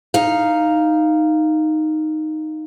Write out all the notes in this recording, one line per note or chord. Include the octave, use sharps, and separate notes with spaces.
D#4 F5